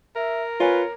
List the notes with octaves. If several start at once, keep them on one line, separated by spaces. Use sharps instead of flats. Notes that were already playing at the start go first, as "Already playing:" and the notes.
A#4 E5
F4 B4 C#5 G#5